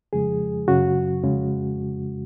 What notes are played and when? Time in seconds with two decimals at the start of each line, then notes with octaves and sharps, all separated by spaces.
0.13 F2 C#3 F3 G#3 G#4
0.68 F#2 C#3 F#3 F#4
1.23 F2 C#3 G#3